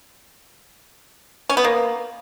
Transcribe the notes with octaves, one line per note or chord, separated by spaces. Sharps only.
C#4
B3
A#3